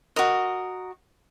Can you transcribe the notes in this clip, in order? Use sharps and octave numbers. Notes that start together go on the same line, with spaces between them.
F#4 A#4 D#5